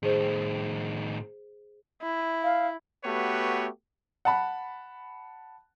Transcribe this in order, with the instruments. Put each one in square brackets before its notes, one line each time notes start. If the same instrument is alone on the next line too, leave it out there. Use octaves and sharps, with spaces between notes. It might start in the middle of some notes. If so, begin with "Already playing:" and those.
[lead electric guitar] A2 D#3 [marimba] G#4 C5
[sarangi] E4
[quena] F5
[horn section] A3 B3 F#4 G4 B4 C#5
[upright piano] F#5 A5 B5